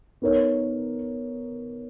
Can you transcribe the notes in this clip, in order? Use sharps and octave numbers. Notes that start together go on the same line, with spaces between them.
B3 D#4 A#4 C#5